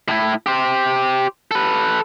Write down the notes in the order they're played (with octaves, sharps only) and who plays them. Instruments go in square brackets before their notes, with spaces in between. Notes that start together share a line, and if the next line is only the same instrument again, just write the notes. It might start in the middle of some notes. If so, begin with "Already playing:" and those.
[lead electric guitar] A2 E4
G4 C5
A4 B4